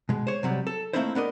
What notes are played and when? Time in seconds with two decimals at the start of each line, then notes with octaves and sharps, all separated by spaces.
0.09 B2 G#3
0.27 C5 C#5
0.43 C3 F#3 G3
0.67 A4
0.93 A3 A#3 C4 D#4 E4 C5
1.15 B3 D4 A#4 D#5